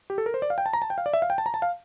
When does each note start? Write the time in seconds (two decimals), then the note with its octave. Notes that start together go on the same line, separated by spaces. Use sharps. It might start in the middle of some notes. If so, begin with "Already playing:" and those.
0.10 G4
0.18 A4
0.26 A#4
0.34 C5
0.42 D5
0.50 F5
0.58 G5
0.66 A5
0.73 A#5
0.82 A5
0.90 G5
0.98 F5
1.06 D5
1.13 E5
1.22 F5
1.30 G5
1.38 A5
1.46 A#5
1.54 A5
1.62 F5